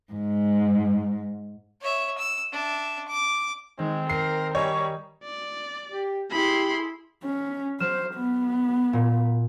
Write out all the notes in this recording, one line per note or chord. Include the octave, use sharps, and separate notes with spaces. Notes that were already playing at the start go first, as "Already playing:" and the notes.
G#2
C#5 E5
E6
D4 E5
D6
D#3 G#3 C4
A#4 C7
G3 C#5 D#5 G#5 A#5
D5
G4
E4 G4 G#4 B5 C6
C#4
F#3 C5 F6 E7
B3
A#2